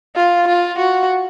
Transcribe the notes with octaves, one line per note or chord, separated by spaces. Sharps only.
F4
F4
F#4